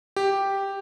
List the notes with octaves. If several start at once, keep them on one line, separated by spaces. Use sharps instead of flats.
G4